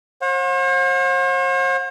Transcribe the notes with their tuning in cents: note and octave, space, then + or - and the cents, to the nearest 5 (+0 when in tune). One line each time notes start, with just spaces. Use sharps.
C5 +45 F#5 -40